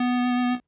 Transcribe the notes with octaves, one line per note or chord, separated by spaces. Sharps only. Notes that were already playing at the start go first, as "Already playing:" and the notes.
Already playing: B3